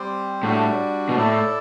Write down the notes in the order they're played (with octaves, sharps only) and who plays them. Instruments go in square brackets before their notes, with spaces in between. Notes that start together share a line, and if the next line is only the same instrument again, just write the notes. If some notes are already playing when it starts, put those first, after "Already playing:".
Already playing: [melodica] G3 C4 G4 C5
[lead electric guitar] A2 [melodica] G3 D4 F#4
[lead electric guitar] B2
[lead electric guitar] A2 [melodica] E4 A4 D5